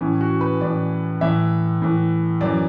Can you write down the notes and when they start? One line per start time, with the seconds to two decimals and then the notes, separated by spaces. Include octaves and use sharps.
0.01 A2 E3 C#4
0.21 F#4
0.41 B4
0.61 A2 E3 D5
1.21 A2 E3 E5
1.82 A2 E3
2.41 F#2 E3 D5